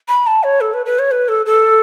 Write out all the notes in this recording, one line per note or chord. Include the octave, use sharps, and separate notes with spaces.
B5
A5
C#5
A4
B4
B4
C#5
B4
A4
A4